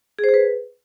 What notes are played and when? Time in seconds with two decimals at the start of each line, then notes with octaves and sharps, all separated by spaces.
0.19 G#4
0.24 C5
0.29 G#4
0.34 B4